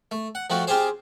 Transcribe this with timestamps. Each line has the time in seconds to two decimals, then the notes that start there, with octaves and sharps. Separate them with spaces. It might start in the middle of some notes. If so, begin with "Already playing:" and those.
0.11 A3
0.35 F#5
0.50 F3 A3 C4 F#4
0.67 C4 F4 G4 G#4 C5